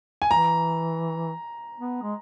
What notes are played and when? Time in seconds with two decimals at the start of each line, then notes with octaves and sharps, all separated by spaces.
0.22 G#5
0.30 E3 A#5
1.78 B3
2.03 G#3